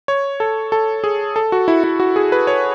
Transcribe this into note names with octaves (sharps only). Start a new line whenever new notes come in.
C#5
A4
A4
G#4
A4
F#4
E4
E4
F#4
G#4
B4
C#5